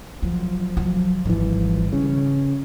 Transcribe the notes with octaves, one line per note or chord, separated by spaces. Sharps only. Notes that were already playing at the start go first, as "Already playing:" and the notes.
F3 F#3
F#3
G#1 D3 E3 G3
C#3 C#4